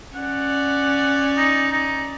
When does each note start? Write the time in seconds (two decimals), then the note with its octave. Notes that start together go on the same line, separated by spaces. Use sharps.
0.15 C#4 D5 F#5
1.37 D#4
1.73 D#4